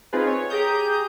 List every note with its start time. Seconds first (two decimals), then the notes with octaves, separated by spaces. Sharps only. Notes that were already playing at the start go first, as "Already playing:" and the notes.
0.13 C4 D#4 F4 G#4 B4
0.27 C#5
0.50 G4 G#4 A#5 D#6 G6